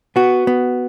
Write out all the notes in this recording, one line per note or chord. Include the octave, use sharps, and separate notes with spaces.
B3 F#4
B3